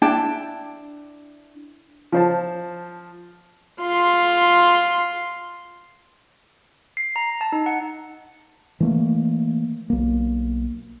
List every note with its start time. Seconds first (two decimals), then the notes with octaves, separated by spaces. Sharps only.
0.02 D4 E4 G5 A5
2.12 F3 C5 A5
3.82 F4 C6
6.97 C7
7.16 A#5
7.41 A5
7.52 D#4
7.66 F#5
8.80 E3 A3 A#3
9.90 B1 A#3